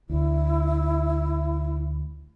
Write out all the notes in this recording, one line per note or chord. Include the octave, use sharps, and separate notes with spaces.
D2 E4